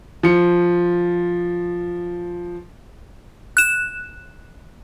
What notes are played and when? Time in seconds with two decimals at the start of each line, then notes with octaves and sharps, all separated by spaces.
0.23 F3 C#7
3.57 F#6 E7